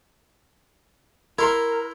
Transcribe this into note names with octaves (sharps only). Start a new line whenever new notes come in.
E4 A#4 C6